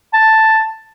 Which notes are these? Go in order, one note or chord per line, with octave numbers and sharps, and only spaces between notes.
A5